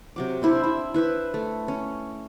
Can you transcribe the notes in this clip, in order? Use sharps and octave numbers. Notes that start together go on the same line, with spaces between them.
C3 F#3 D6
C4 D4 E4 C5
E4
E4 B4 C5 E5
A3
C#4